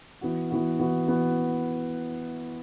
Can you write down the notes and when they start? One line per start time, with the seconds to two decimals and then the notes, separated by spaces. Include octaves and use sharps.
0.21 E3 B3 F#4
0.51 E3 B3 F#4
0.79 E3 B3 F#4
1.08 E3 B3 F#4